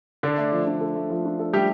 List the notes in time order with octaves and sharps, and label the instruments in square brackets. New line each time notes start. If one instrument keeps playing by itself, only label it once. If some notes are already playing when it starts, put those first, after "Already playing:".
[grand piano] D3 D4 [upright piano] A4
[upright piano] A3
F3
D4
A4
A3
F3
D4
A4
[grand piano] G3 G4 [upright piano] A3